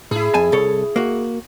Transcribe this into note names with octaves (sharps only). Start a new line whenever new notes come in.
A2 E4 G#4
F2 G#5 A5
C2 A4 C#5
A#3 F#4